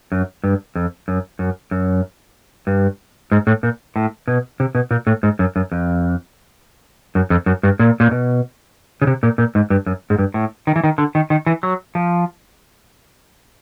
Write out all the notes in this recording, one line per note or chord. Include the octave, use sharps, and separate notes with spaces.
F#2
G2
F2
F#2
F#2
F#2
G2
G#2
A2
A#2
A2
B2
C3
B2
A#2
A2
G#2
F#2
F#2
F2
F#2
F2
F#2
G2
A#2
A#2
B2
C#3
C3
A#2
A#2
G#2
G2
F#2
G#2
G2
A2
D#3
E3
D#3
D3
D#3
D#3
E3
F#3
F3